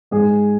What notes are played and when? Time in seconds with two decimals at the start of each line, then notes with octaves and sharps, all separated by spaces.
0.11 G#2 G#3 G#4